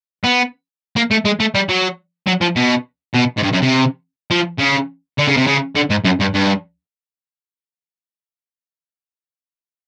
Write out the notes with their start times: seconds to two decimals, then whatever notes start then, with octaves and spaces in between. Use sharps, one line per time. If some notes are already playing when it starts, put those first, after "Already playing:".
0.24 B3
0.96 A#3
1.11 A3
1.25 G#3
1.40 A3
1.55 G3
1.69 F#3
2.27 F#3
2.41 F3
2.56 B2
3.14 B2
3.37 G#2
3.43 G2
3.53 F#2
3.62 C3
4.31 F3
4.59 C#3
5.18 D3
5.27 C#3
5.37 C3
5.47 C#3
5.75 D3
5.90 G#2
6.04 F#2
6.20 G2
6.34 G2